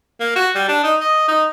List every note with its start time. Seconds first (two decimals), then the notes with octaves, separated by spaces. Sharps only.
0.20 A#3
0.36 F#4
0.55 G3
0.69 D4
0.84 D#4
1.01 D#5
1.28 D#4